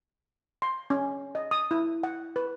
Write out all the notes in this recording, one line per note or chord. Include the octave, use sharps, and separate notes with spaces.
C6
C#4
D#5
D#6
E4
F#5
B4